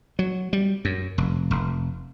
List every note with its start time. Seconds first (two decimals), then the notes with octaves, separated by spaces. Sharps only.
0.19 F#3
0.53 G3
0.85 F#2
1.18 F1
1.51 F1